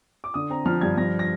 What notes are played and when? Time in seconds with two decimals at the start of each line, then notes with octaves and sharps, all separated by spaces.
0.24 D6
0.34 D3 D#6
0.50 C4 A#5
0.66 F3 F6
0.81 G2 G#6
0.97 F3 A#6
1.19 A#6